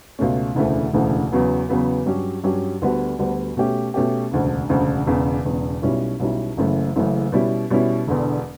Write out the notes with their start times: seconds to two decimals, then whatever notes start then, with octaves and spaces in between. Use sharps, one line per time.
0.19 C#2 B2 A3 C#4
0.55 E1 D2 C#3 E3 A3
0.93 E1 D2 C#3 E3 A3
1.32 E2 C#3 F#3 B3
1.69 E2 C#3 F#3 B3
2.06 G2 F#3 C#4 G4
2.43 G2 F#3 C#4 G4
2.82 D2 D3 G3 B3 F#4
3.19 D2 D3 G3 B3 F#4
3.57 B2 A3 C#4 G4
3.94 B2 A3 C#4 G4
4.32 E1 D2 C#3
4.69 E1 D2 C#3
5.07 E1 E2 C#3
5.45 E1 E2 C#3
5.82 B1 B2 G3 C#4 E4
6.20 B1 B2 G3 C#4 E4
6.57 F#1 F#2 C#3 E3 A3
6.96 F#1 F#2 C#3 E3 A3
7.32 B2 G3 C#4 E4
7.70 B2 G3 C#4 E4
8.07 E1 E2 D3